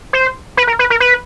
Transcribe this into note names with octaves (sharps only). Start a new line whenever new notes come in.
C5
B4
A#4
B4
A#4
B4